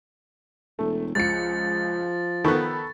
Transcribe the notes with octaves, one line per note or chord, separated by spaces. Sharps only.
E1 A3
C#2 F3 A6 C#7
D#3 B3 A4 B5 C#6